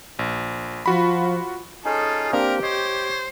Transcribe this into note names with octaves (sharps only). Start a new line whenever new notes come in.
A#1
F3 F4 F#4 B5
C#4 D#4 F4 G#4 A4
A#3 C4 D4 G4 A#4
C5 C#5 D#5